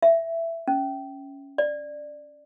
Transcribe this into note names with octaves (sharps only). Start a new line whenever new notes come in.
E5
C#4
D5